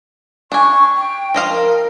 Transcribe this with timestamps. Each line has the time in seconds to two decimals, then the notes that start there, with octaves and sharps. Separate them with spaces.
0.52 D4 G#5 C#6
0.95 G5
1.34 F3 D#5 F5
1.49 A#4